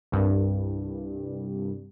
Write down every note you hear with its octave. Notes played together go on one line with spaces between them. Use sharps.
C2 G2